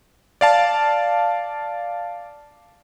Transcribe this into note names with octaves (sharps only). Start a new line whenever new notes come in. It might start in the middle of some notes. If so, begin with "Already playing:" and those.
D5 F5 A5